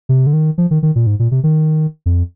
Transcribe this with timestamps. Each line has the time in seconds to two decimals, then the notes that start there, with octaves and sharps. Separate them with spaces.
0.09 C3
0.27 D3
0.33 D#3
0.58 F3
0.71 D#3
0.83 D#3
0.96 A#2
1.07 G#2
1.19 A#2
1.31 C3
1.44 D#3
2.06 F2